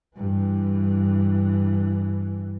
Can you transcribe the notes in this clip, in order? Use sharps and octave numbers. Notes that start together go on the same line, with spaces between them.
G2 E3